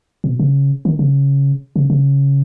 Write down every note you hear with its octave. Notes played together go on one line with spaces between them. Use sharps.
B2
C#3
D#3
C#3
C#3
C#3